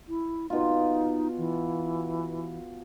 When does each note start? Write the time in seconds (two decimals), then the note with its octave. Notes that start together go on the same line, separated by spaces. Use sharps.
0.08 E4
0.50 B2 D#4 F4
1.38 E3